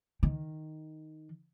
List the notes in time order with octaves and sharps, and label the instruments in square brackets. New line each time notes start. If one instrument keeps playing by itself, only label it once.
[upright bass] D#3